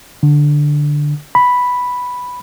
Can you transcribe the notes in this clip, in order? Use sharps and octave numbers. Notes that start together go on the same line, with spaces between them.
D3
B5